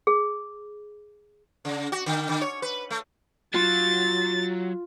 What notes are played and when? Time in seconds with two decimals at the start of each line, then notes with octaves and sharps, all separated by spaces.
0.07 G#4
1.65 C#3
1.92 F#4
2.06 D3
2.29 D3
2.42 C#5
2.62 B4
2.91 A3
3.54 F#3 F4 A6